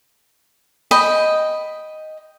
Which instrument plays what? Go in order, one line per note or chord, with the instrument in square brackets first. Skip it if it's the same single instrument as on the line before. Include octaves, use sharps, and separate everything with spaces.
[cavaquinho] D#5 G5 B5